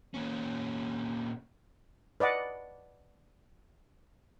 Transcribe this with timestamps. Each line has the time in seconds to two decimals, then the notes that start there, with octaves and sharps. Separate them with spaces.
0.14 A#2 C#4
2.20 B4 D5 D#5 F#5